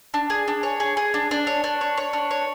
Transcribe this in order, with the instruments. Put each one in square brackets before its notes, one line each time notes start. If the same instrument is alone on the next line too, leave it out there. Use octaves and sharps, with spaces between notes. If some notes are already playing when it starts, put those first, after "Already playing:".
[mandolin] D4
G#4
D4
C#5
G#4
G#4
D4
D4
C#5
D4
C#5
C#5
D4
C#5